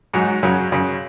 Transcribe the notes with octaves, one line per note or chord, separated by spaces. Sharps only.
G#2 F#3 D#4
F#2 C#3 F#3
F#2 C#3 F#3